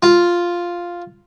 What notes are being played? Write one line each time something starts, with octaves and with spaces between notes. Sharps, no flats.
F4